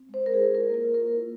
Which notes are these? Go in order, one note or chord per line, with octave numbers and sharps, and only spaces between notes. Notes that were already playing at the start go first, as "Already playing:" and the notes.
Already playing: C4
G#3
C5
G#3 A#4
G#4
E4
F4 A#4
A#3 A#4
F4
A#4
F4
E4